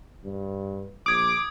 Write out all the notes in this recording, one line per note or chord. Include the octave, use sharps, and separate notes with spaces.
G2
A#1 D6 D#6 G#6